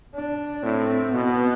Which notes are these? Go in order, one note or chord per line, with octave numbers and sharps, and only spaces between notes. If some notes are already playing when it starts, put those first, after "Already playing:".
D4
A2 C4
B2 B3